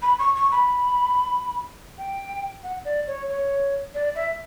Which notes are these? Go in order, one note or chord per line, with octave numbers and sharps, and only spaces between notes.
B5
C#6
C#6
B5
G5
F#5
D5
C#5
C#5
D5
E5